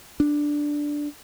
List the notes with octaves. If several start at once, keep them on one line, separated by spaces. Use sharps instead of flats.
D4